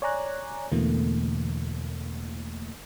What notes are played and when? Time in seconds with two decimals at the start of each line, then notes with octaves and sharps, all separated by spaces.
0.02 C#5 D5 G#5 A#5 F#6
0.72 E2 B2 D3 E3 A3 A#3